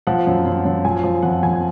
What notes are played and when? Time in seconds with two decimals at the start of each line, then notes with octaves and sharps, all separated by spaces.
0.07 F3 F#5
0.27 F#2
0.45 F#2
0.65 F#2
0.85 F3 G#5
1.04 F3
1.22 F2 F#5
1.43 F2 G#5